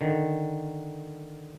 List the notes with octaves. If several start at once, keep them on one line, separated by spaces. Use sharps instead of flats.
D3 D#3